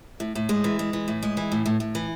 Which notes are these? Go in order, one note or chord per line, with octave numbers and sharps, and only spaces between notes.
A2
A2
G#3
E3
G#3
E3
A2
G#3
E3
A2
A2
A2
E3